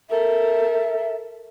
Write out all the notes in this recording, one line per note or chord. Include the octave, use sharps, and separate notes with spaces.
A4 A#4 E5